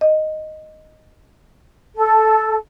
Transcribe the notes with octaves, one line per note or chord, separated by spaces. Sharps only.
D#5
A4